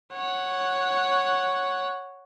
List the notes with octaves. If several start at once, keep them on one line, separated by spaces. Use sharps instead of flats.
C#5 F#5